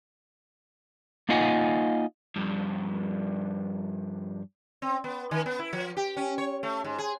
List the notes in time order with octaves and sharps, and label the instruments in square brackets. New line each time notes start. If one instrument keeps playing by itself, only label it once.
[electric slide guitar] A#3 D#4 F4 D#5 F#5 G#5
[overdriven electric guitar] G2 F3
[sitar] C4
B3
D#3
B3
E4
F3
G4
C#4
C#5
A3
G#2
G#4